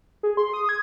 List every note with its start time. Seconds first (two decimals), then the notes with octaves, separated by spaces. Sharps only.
0.23 G#4
0.37 C6
0.54 D#6
0.69 G#6